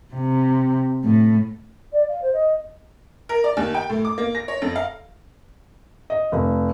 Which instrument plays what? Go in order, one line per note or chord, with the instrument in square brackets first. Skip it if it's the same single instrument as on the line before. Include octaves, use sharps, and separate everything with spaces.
[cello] C3
A2
[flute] D5
F5
C5
D#5
[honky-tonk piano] A#4
D5
D#2
G5
A2
D6
A#3
A#6
C#5
F2
F5
[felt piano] D#5
F1